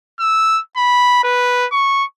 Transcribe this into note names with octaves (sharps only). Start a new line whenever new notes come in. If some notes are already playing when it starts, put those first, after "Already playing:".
E6
B5
B4
C#6